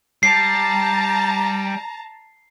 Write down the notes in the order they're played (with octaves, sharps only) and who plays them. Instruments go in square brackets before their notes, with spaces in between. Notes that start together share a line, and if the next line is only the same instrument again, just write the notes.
[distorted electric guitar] G3 [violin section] A5 A#5 [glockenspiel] C7